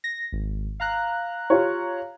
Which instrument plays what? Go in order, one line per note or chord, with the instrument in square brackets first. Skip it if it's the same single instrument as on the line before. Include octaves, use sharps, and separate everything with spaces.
[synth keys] A#6
G#1
F5 A#5 F#6
[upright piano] F4 G4 C#5